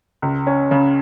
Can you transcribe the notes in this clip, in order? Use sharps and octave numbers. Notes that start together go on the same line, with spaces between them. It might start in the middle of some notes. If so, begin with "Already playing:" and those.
C#2
C#4
C#3